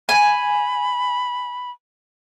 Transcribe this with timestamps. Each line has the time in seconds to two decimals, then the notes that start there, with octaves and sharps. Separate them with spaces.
0.09 G#5 B5